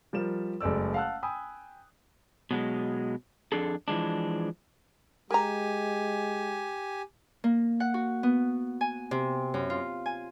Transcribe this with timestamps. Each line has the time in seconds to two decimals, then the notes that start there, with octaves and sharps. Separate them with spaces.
0.13 F3 G3 A#4 E7
0.61 F#1 G#3 A3 D5 E6
0.94 F5 F#5 A5 E6 F#6
1.23 G5 G#5 B5 D#6 E6
2.51 B2 F#3 G#3
3.52 F2 D4 G#4 A4
3.88 E3 F3 G#3 D4
5.31 G#3 G4 A#4 G#5 A#5
7.44 A#3
7.80 F#5
7.94 F#4
8.23 B3
8.81 G#5
9.11 C3
9.54 F#2
9.70 F4
10.06 G#5